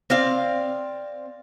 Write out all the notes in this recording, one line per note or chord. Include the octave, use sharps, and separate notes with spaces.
C4 D5 F5